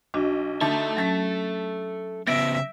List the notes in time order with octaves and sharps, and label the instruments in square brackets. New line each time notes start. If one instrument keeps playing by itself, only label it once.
[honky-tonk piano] B1 [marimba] D4 F#4
[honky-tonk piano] D3 D#4 A5 [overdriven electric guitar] A4 E5
[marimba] F#3 C#4 [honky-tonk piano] A5 A6 B6
[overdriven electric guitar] C#3 B3 [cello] E5 [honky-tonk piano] A#6 D7